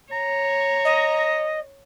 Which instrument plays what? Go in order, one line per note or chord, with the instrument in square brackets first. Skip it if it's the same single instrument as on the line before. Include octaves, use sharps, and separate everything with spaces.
[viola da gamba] C#5 [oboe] A#5
[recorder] D#5